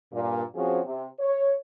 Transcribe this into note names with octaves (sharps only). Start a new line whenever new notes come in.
G2 A#2
F3 C4 C#4 F#4 G#4
C3
C#5